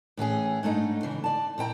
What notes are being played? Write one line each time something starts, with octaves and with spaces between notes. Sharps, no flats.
A2 E3 C#4 G#4
G#2 A3 D4 D#4
C#3 E3
D5 A5
A#2 E4 G5 A#5